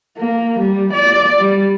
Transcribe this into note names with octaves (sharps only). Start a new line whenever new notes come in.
A#3
G3
D5
G3